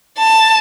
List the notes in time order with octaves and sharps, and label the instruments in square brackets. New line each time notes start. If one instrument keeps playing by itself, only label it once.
[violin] A5